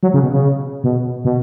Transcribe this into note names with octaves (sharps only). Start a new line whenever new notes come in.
F#3
C#3
B2
C#3
B2
B2